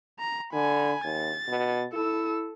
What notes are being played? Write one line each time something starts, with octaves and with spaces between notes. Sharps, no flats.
A#5
D3 G#5 B5
D#2 A6
B2
E4 A4 E6